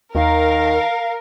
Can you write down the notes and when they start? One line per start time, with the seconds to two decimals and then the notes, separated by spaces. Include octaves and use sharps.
0.15 D#2 D#3 A#4 F5